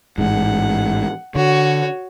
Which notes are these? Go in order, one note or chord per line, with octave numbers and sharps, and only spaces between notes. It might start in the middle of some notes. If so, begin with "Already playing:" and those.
A1 G#2 F#5
D3 F#4 C#5